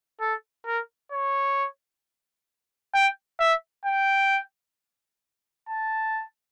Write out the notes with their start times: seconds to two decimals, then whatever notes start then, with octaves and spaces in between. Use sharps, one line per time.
0.21 A4
0.66 A#4
1.12 C#5
2.94 G5
3.40 E5
3.85 G5
5.69 A5